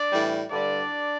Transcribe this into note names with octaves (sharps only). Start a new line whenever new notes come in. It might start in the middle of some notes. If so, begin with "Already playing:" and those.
Already playing: D4 D5
A2 E3 G3
G2 D3 G3 D4 D5